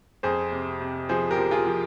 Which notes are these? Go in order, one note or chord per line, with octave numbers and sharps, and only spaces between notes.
F2 G#4 C5
C3
C3
F3 G#4 C5
G4 A#4
F3
F4 G#4
F3